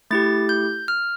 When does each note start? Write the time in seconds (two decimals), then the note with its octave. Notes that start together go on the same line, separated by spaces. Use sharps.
0.11 A3 E4 G4 A6
0.49 G6
0.88 F6